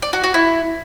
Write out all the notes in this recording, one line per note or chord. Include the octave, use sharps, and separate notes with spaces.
D5
F#4
F#4
E4